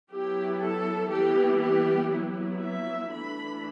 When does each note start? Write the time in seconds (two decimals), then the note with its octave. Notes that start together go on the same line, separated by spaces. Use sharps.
0.12 F#3 B3 E4 G4
0.62 A4
1.11 E3 G3 B3 G4
1.61 G4
2.12 F#3 B3 E4
2.62 E5
3.12 E3 A3 D4 B5